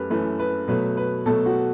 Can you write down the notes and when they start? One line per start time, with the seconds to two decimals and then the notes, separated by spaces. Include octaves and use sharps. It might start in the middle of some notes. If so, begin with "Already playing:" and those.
Already playing: F#2 A3 G4 B4
0.10 F#2 E3 A3 B4
0.39 B4
0.68 B2 F#3 A3 B4
0.97 B4
1.26 B2 F#3 A3 A4
1.46 F#4